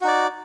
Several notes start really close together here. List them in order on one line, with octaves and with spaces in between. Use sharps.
F#4 D#4 D5